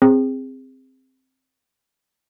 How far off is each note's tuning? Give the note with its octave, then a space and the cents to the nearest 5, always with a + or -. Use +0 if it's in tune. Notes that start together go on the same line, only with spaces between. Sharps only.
C4 +5 G#4 -25